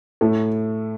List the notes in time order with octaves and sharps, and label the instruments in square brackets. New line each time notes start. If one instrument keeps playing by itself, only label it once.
[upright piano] A2 A3